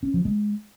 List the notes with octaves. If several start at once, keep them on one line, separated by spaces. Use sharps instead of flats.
C#4
F3
G#3